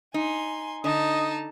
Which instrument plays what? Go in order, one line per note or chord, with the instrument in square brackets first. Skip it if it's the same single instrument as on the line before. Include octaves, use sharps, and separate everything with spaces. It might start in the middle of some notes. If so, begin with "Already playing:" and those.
[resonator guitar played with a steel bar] D#4 [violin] G#5 C6
[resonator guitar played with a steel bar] D3 [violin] D#4 A5 [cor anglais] D#5